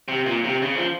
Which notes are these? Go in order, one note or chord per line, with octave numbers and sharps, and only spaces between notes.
C3
A#2
C3
C#3
F3